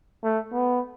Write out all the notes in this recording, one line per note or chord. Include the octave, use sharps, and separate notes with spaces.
A3
B3